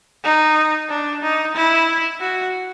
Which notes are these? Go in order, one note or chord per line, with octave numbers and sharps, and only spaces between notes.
D#4
D4
D#4
E4
F#4